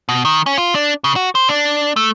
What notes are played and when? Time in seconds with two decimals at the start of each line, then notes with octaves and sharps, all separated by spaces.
0.09 B2
0.25 D#3
0.46 C#4
0.58 F4
0.75 D4
1.04 C#3
1.16 F#4
1.35 C5
1.49 D4
1.96 A3